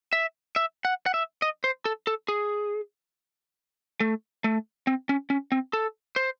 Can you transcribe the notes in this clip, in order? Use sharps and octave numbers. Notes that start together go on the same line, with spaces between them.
E5
E5
F#5
F#5
E5
D#5
C5
A4
A4
G#4
A3
A3
C4
C#4
C#4
C4
A4
C5